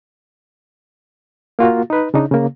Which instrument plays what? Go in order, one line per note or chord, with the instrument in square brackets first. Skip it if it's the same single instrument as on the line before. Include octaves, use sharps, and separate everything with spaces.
[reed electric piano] A#3 F4 F#4
D#4 B4
C#3 D4 D#4
C#3 A#3